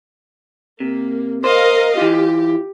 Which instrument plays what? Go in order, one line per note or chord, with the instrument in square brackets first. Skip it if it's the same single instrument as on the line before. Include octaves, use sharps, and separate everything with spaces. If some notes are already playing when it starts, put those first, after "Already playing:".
[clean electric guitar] C3 [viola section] A#3
[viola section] A#4 D#5 F5 [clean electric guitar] C5
[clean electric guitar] E3 F4 [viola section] G4